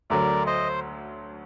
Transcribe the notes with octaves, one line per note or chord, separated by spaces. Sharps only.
D2 D3 F#3 A#4 D5
C5 D#5